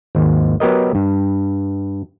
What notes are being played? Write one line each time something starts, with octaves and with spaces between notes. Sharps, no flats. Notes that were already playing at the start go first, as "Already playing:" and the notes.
G#1 D#2
F#3 B3 G4 A#4 D#5
G2